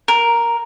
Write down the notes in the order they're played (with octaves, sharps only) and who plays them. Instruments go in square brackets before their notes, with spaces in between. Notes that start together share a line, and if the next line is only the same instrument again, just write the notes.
[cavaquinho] A#4